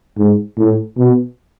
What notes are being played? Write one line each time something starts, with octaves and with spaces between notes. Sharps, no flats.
G#2
A2
B2